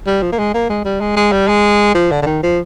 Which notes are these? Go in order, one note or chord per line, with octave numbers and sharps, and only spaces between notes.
G3
F3
A#3
G#3
A#3
G#3
G3
G#3
G#3
G3
G#3
F3
D3
D3
D#3
F3